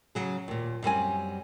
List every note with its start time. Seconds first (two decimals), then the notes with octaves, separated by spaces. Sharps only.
0.15 C#3 F#3 G#4
0.48 D#2 A#2
0.83 F#2 G3 C4 G#5